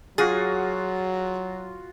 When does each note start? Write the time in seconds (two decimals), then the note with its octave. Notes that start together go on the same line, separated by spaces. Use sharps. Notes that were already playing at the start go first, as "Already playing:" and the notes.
0.18 F#3 F4 F#4 G#4